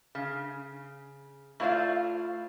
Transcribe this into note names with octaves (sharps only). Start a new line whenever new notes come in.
C#3
A3 E4 F4 C5 D5 F5